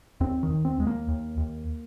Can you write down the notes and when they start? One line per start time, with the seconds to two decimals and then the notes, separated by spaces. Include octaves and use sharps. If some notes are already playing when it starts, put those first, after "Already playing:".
0.20 D#2 C4
0.43 D#3
0.50 D#2
0.65 C4
0.79 D#2 G#3
0.87 A#3
1.08 D#2
1.38 D#2